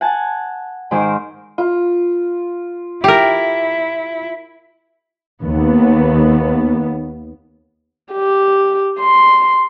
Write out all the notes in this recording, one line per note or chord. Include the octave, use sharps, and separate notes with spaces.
F#5 G#5 A5
G#2 D#3 G#4 C5 D6 D#6
F4
E4 G4 A#4
D#2 B3
G4
C6